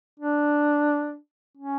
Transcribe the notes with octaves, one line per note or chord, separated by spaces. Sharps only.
D4
C#4